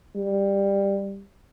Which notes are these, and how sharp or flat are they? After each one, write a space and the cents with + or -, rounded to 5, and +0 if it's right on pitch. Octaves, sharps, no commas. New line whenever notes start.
G3 +15